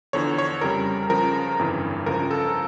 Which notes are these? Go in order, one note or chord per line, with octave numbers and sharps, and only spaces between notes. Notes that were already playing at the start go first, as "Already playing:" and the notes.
E2 D3 F3 C#5
C#5
F2 C#3 G3 A#4
C#2 C#3 F3 A#4
G1 F2 C#3 E3
C#2 C#3 F3 A#4
A4